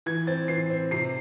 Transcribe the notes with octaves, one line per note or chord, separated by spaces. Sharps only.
E3 G#6
C4 A6
E3 C7
C4
C3 C7